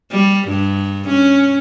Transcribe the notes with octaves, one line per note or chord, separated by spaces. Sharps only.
G3
G2
C#4